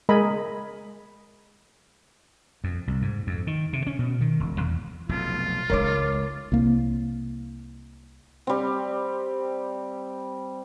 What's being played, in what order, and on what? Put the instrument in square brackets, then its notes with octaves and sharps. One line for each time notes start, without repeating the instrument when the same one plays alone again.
[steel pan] G#3 A#4 D#5 G#5 B5
[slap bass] F2
C2
G#2
F2
D#3
C3
C#4
B2
D#3
E1
E2
[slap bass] F1 B1 F2 [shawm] F4
[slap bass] C#2 [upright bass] G#3 D#4 [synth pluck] A#4 C#5 D6
[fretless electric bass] C2 A#3
[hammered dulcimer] G3 C4